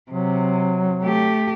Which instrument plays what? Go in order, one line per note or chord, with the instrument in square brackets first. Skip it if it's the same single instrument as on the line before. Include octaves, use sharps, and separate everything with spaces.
[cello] C3 [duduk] F#3
[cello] A3 G4